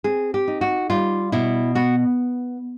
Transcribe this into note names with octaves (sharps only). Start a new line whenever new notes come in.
C4 G#4
G4
D#4
F#4
G3 F4
B2 E4
B3 F#4